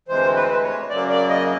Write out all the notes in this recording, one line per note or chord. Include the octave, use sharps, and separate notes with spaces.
D2 C3 E3 G#3 C5
B4
C5
B4
C#5
F#2 C#3 F#3 A#3 D5
D5
D#5